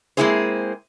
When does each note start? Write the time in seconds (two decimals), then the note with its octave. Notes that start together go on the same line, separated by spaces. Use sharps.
0.17 G#3 A#3 C4 E4 G#4 C5